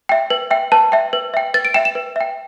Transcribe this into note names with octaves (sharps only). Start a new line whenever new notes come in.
E5 G5
B4
E5 G5
B4 A5
E5 G5
B4
E5 G5
B4 A6
D7
E5 G5 E7
E7
B4
E5 G5